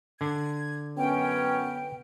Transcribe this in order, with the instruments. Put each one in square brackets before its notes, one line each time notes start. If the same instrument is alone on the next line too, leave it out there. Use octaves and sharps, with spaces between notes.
[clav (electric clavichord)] D3 D4 [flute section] G#6
[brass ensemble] F#2 C#4 [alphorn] B3 [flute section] G5